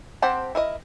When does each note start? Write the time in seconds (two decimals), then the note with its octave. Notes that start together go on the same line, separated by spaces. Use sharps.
0.22 C4 G4 C5 F#5 A5
0.55 E4 A#4 D#5